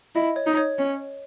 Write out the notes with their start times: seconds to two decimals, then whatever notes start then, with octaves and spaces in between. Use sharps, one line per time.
0.15 E4 D#5
0.36 C#5
0.46 D#4
0.57 C#5
0.78 C#4